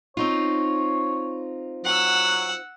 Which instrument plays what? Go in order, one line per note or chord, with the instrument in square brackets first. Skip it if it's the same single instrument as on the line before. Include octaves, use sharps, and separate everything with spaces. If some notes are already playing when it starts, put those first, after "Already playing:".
[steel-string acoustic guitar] C4 D#4 F4 [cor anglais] C#5
[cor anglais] F#3 [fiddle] F#5 E6